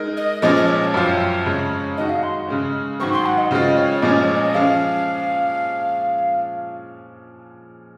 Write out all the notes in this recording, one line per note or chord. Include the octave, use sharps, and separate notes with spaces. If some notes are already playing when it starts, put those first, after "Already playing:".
Already playing: G#3 D#4 A#4
D#5
A#2 F3 G#3 C#4 D#5
D#5
C#5
C#5
F#2 F3 C4 F4 C5
F2 C#3 G#3
D#3 G#3 D#4 F#4 D#5
F5
C6
C#3 G#3 C#4
G#2 D#3 F#3 C4 C#6
C6
F#5
D#5
C#3 G#3 C4 F4 D#5
C#5
A#2 F3 G#3 C#4 G#4 D#5
C#5
D#5
F3 G#3 C#4 F5